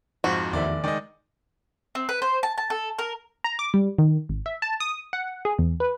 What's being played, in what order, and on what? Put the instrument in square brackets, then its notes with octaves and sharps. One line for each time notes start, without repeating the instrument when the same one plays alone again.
[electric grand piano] F2 G#2 F3 [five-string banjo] F#4
[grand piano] F1 D5 [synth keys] E2 D#3 E5
[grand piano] D#3 G#3 [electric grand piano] D5 D#5 [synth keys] G#5
[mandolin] C4
B4
C5
A5
A5
A4
A#4
[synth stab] A#5
D6
G3
D#3
G#1
E5
A5
D#6
F#5
G#4
E2
B4